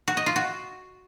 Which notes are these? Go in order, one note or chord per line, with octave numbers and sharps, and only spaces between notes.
F#4
D#5
F4
F#4